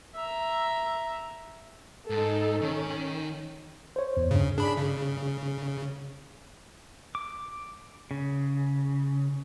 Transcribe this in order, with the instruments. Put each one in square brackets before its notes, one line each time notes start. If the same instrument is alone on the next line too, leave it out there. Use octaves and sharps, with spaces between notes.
[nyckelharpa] E5 A#5
[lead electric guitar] G#2 [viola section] D#4 A4
[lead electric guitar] D#3 [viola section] C#4
[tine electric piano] C5 C#5
E2
[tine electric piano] G2 [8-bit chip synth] C#3
[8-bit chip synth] D4 B5 [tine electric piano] G#4
[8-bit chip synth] C#3
[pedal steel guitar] D6
C#3